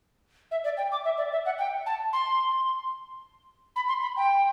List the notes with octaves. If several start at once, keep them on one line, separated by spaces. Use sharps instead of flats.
E5
D5
G5
D6
E5
D5
E5
F#5
G5
A5
C6
B5
C6
B5
G5